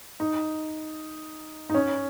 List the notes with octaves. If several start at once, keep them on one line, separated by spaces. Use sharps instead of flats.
D#4
D#4
C#4